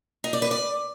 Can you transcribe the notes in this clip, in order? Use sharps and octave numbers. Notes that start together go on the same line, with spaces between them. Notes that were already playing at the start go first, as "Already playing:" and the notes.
D#4
D5
B4
D5